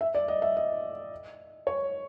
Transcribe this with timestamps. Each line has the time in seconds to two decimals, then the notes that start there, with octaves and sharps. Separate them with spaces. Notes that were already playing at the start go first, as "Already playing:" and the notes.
0.01 E5
0.15 D5
0.28 D#5
0.42 E5
0.57 D#5
1.67 C#5